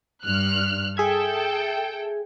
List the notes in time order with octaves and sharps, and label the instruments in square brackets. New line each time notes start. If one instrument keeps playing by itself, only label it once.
[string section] G2 F6 F#6
[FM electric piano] G#4 E5 G#6 [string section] A4 G5